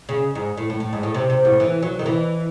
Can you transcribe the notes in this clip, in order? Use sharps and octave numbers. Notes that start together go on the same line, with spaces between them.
C#3
G#2
A2
A2
A2
G#2
A2
C3
C3
A2
E3
F#3
D#3
E3